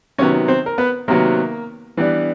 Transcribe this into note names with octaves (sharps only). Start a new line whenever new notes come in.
C3 D#3 F#3 B3 C#4 C#5
C4 C5
A#4
B3 B4
C3 D#3 F#3 A#3 B3 A#4
E3 G3 B3 D4